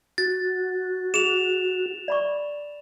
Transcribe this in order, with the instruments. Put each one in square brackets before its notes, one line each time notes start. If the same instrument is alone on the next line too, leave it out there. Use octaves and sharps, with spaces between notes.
[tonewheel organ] F#4 [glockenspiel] A6
[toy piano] G#4 [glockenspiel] E7 F7
[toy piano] D5 B5 C#6